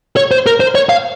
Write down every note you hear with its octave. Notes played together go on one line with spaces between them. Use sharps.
C#5
C5
A#4
C5
C#5
F5